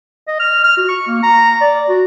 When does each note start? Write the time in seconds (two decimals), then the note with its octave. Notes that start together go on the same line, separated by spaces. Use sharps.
0.28 D#5
0.40 F6
0.64 F6
0.77 F#4
0.89 C#6
1.07 A#3
1.23 A#5
1.61 D5
1.89 F#4